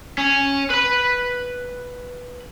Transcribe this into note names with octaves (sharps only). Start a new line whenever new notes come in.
C#4
B4 B5